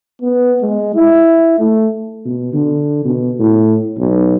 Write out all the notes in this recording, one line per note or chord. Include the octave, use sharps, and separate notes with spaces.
B3
G#3
E4
A3
B2
D3
B2
A2
B1